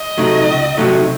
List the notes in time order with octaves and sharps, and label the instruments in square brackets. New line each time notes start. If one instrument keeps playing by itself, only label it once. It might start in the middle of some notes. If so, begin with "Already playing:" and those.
Already playing: [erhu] D#5
[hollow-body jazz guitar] C3 F#3 A3 D#4
C#2
C3 F#3 A3 D#4